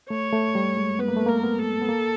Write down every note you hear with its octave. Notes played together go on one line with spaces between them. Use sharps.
A3 C#5
A3
G3
G#3
B3 B4
A#3
A3
A#3 A#4
B3
A4
B3
A#3